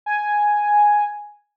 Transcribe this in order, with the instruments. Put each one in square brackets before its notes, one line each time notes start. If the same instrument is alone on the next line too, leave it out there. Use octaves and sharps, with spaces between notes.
[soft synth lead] G#5